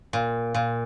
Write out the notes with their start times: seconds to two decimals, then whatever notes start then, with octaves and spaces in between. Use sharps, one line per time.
0.13 A#2
0.54 A#2